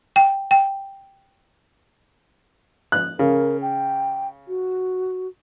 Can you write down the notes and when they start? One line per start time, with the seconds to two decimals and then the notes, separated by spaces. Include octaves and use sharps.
0.16 G5
0.51 G5
2.92 F#6
3.19 C#3 A#4
3.62 G5
4.48 F#4